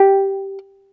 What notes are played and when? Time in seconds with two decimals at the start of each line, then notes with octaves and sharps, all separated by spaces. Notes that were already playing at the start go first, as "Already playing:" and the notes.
Already playing: G4